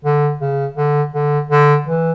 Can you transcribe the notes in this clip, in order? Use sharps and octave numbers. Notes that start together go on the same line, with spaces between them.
D3
C#3
D3
D3
D3
E3